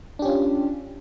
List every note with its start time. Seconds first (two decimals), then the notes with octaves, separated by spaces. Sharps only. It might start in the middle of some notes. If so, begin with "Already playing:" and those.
0.19 D4
0.22 G4
0.25 C#4
0.28 F4